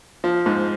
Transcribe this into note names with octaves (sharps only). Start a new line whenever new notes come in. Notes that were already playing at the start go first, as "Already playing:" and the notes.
F3
G#2